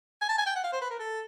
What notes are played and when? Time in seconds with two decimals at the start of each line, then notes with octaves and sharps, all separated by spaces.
0.22 G#5
0.29 A5
0.38 G#5
0.46 G5
0.55 F#5
0.64 F5
0.73 C5
0.81 B4
0.91 A#4
0.99 A4